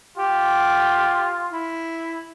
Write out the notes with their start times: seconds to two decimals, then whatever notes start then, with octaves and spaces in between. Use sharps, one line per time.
0.17 F4 G4
1.51 E4